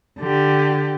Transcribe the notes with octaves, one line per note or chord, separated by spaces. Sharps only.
D3 G4